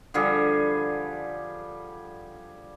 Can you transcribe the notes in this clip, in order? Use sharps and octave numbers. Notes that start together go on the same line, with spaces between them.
D3 F3 G3 G#4